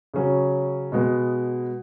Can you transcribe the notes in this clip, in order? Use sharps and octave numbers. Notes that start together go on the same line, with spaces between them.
C#3 F#3 C#4
B2 G#3 B3